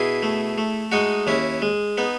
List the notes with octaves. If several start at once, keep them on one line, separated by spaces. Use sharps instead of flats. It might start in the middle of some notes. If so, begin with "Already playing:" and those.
Already playing: B2 E4 G#4
A3
A3
G#3 D#4 F#4
D#2 C#4 E4
G#3
B3 D#4